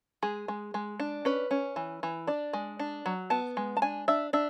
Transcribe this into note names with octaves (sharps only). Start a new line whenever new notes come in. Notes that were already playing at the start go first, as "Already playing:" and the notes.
G#3 G#4
G#3
G#3
D4
C#4 B4
C#4
E3
E3
D4 D5
G#3
D4
F#3
B3 A5
G#3
A5
D4 G#5
D4 E5
D4 E5